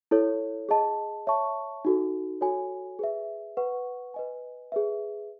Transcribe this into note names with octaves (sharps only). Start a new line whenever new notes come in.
E4 A4 C#5
G#4 D#5 A5
C#5 E5 A5 C#6
D#4 F#4 A4
F#4 A4 C#5 G#5
G#4 B4 E5
B4 F#5 C#6
B4 D#5 G#5
G#4 B4 E5